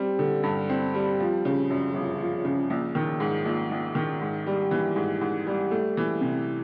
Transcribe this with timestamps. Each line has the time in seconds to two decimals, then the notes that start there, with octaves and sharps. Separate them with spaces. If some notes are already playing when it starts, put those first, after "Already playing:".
Already playing: G3 C4
0.19 D3
0.43 G2
0.69 C4
0.94 G3
1.20 F3
1.45 C#3
1.70 F#2
1.94 G1
2.20 F3
2.45 C#3
2.70 A#1
2.95 D#3
3.20 G#2
3.45 A#1
3.71 A#1
3.95 D#3
4.21 G#2
4.47 G3
4.71 E3
4.96 G#2
5.21 G#2
5.47 G3
5.71 A3
5.97 E3
6.21 C3